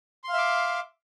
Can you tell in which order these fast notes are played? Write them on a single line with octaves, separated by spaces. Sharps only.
C6 F5 E5 D6